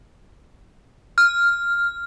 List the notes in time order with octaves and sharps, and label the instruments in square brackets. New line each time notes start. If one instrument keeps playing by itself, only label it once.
[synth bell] F6